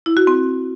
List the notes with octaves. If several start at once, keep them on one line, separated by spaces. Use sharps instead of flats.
E4
F#4
C4